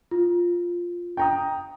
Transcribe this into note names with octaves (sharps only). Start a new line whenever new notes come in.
F4
G5 A#5 D#6